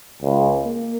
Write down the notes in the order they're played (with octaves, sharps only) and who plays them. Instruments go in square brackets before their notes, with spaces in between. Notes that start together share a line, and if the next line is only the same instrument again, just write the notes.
[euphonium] C#2
A#3